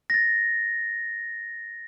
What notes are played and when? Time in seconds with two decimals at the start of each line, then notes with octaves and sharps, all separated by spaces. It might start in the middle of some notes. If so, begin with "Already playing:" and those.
0.10 A6 A#6